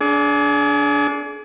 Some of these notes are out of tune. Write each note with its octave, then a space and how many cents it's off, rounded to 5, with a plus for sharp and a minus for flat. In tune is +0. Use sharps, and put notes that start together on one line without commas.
D4 -20 G#4 +30